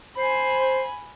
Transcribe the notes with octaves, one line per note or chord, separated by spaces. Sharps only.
C5 G#5 B5